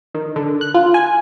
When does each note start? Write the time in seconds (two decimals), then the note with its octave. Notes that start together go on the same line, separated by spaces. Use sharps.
0.14 D#3
0.36 D3
0.61 F#6
0.74 F4
0.94 G#5